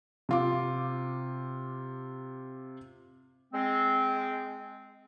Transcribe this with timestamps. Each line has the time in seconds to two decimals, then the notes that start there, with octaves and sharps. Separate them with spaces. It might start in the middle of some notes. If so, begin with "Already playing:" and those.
0.29 C3 F4 D6
3.53 G#3 C4